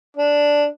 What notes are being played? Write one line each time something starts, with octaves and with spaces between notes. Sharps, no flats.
D4